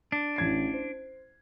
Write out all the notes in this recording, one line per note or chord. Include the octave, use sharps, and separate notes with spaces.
D4
A1 G#6 C7
C5